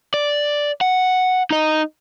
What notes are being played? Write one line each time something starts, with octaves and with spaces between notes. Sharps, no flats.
D5
F#5
D#4 D#5